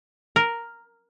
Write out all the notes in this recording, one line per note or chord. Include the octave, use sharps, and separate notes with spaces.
A#4